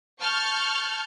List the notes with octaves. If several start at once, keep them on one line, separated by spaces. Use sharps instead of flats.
A5 C#6 F6 G6